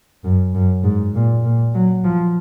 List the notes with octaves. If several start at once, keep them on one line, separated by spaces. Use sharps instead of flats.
F#2
F#2
G#2
A#2
A#2
F#3
F3